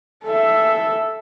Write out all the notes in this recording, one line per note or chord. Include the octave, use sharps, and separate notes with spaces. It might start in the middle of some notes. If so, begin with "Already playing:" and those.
A4 E5